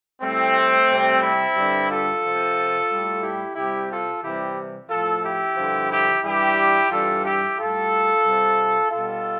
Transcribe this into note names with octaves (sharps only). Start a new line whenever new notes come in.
A2 G3 A3 C4
C3 G3
C4 E4
G2 D3 G3
F4 A4
C3 F3
A2 G3
E4 G4
C3 G3 E4 G4
F4 A4
C3 E3 G3 E4 G4
A2 F3 F4 A4
E4 G4
G2 D3 F3
E4 G4
G2 E3 G3 E4 G4
G2 E3 G3 F4 A4
E4 G4
A2 G3 F4 A4
C3 G3
B2 G3 F4 A4